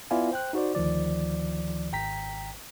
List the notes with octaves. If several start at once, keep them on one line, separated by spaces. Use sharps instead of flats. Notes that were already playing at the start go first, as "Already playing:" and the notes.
B3 E4 F4 D5 F5 G#5
C5 G5 F#6
D#4 F#4 C5 D5
D2 D#3 F3 D5
G#1 G5 A#5 B6